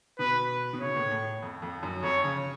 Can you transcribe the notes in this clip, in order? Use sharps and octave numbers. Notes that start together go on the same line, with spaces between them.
B2 B4
B2
C#3 C#5
A2
A2
F2
F2
F#2
F2 C#5
C#3